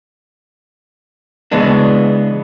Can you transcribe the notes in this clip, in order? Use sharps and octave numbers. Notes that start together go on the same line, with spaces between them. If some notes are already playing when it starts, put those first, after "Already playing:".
C#3 E3 G#3 B3 D4